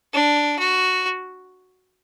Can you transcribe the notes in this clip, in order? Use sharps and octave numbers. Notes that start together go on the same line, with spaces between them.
D4
F#4